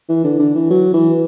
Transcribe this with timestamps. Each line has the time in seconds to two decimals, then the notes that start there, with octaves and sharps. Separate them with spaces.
0.09 E3
0.24 D3
0.39 D3
0.55 E3
0.70 F#3
0.94 E3